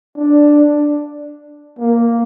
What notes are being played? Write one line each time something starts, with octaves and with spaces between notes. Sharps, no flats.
D4
A#3